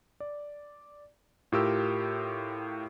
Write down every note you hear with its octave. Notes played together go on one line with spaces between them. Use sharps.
D5
A2 F4 G4 A#4 E6